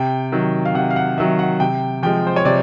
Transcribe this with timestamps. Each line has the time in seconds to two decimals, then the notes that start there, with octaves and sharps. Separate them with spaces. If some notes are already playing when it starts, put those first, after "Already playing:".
Already playing: C3 G5
0.32 D#3 F#3
0.65 F5
0.75 C3 F#5
0.90 F5
0.96 F#5
1.18 D#3 F#3 E5
1.39 F#5
1.60 C3 G5
2.03 F3 G#3 G5
2.27 C5
2.36 C#5
2.45 C3 D5